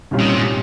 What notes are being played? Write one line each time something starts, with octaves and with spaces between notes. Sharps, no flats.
C2 A#2 G3 C#4 F4
D#3
C3
G#2